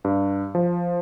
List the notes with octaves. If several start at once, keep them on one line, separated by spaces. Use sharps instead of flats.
G2
F3